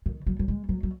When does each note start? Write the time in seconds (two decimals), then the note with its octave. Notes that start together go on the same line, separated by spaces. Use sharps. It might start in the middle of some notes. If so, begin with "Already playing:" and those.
0.06 D#3
0.27 F#3
0.39 F#3
0.48 G#3
0.69 F#3
0.83 F#3